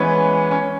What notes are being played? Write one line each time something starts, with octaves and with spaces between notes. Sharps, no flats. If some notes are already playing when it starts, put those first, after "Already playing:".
Already playing: E3 G#3 B3 C#4
C#4